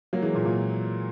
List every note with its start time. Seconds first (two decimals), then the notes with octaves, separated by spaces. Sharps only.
0.13 F#3 A#3
0.22 E3 G#3
0.34 A#2
0.45 A#2